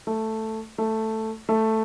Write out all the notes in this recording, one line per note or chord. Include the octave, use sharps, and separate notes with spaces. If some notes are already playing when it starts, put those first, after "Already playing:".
A3
A3
A3